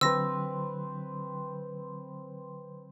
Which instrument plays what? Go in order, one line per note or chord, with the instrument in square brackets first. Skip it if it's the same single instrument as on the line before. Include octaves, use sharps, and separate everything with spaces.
[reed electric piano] D3 F#3 [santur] C4 B4 [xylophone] E6 A#6